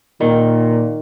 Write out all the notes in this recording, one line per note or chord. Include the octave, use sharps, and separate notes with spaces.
A#2 D#3